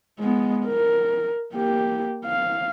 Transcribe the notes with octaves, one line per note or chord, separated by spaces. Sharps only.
G#3 B3
A#4
A#3 G4
F5